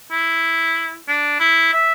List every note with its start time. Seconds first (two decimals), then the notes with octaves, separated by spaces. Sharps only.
0.11 E4
1.08 D4
1.40 E4
1.73 E5